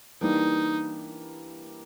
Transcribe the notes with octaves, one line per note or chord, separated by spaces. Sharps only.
E3 G3 A#3 D4 D#4